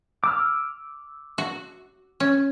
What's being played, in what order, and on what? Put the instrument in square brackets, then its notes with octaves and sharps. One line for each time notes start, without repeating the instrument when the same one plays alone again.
[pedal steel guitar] D6 E6 F6
[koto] F#4
C#4